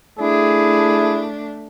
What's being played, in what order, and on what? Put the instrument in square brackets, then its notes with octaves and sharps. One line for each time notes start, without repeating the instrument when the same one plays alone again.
[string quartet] A3 D4 [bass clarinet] E4 [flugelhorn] G#4